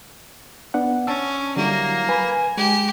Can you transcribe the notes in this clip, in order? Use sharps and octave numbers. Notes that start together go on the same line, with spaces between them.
B3 D4 F#5
C#4 A5 E6
D3 F#3 G3 A#3 E4
B4 G#5 B5
G#3 G4